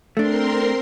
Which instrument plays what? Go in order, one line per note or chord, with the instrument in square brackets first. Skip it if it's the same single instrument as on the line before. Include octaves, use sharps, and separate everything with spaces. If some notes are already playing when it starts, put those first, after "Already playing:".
[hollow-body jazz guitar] A3 D4 [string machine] C4 A#4 C6